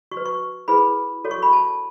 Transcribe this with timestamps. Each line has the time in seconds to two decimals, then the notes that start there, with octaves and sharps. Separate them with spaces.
0.11 F#4 C#6
0.17 B4
0.26 C#6
0.68 E4 G#4 B4 B5
1.24 F#4 A4 C#5
1.31 C#6
1.43 B5
1.53 A5